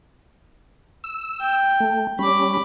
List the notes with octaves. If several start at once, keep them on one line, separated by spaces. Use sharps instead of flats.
E6
G5
A3
G3 C#4 B5 D6